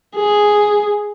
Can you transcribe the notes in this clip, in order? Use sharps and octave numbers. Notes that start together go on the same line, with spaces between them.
G#4